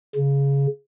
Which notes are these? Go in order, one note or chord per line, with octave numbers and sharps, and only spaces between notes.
C#3